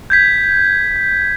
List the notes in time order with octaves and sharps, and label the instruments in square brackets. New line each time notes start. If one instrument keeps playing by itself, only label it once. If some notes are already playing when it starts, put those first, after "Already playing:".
[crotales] G6 G#6 B6